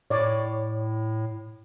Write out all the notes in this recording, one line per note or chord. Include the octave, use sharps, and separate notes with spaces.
A2 C#5 D5